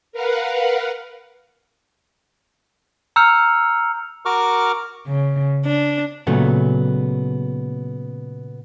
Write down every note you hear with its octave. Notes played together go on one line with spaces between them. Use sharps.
A#4 B4 F5 F#5
A#5 E6 F6 G6 C#7 F7
F#4 A#4 A#5 C#6 D6 F6
C#3
D4
A#2 C#3 F#3 A3 B3